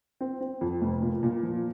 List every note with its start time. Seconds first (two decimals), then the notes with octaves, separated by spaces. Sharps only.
0.21 C4
0.41 C4
0.61 F2
0.81 F1
1.02 A#2
1.23 A#2
1.43 F3